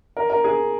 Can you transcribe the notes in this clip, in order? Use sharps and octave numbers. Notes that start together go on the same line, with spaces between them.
A#4
A#4
G#4